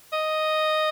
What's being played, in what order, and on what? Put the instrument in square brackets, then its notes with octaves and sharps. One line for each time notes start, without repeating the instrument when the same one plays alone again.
[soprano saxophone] D#5